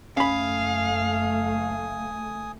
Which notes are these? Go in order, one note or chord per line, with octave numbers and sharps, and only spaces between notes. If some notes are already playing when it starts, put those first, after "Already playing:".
F#1 A3 C#4 F5 G#5 B5 D#6